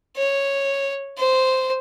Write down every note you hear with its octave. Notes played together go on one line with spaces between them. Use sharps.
C#5
C5